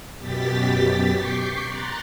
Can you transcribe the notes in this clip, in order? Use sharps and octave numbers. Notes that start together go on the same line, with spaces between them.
F#2 B2 G4 A6 B6
C#6 D6 G6 B6 C7
A#5 C6 F#6 A6